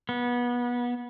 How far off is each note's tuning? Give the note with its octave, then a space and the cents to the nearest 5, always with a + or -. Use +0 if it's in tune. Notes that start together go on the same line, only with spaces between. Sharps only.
B3 -25